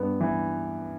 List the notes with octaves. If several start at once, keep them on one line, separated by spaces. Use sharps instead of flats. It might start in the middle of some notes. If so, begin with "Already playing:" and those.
Already playing: G2 B3
E3